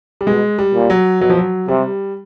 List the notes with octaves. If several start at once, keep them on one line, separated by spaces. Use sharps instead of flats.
G3
B2 G#3
G3
A#2
F#3
B2 F#3
F3
F#3
C3 G3